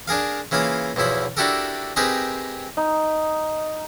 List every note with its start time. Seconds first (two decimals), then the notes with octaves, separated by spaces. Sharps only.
0.08 D4 G#4 A#4 F5
0.51 C#3 E3 A#3 F4 F5 D#6
0.96 B1 E2 F3 E4 D#6
1.37 D4 E4 F#4 G4 A4 A#4
1.96 C4 D#4 G4 G#4 A#4 B4
2.77 D#4